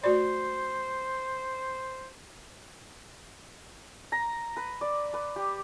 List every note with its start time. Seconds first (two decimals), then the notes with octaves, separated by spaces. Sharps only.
0.04 A3 F#4 C5 D5
4.12 A#5
4.57 B4
4.81 D5
5.14 B4
5.36 G4